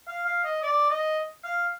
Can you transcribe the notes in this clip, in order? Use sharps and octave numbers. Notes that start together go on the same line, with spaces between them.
F5
F5
D#5
D5
D#5
F5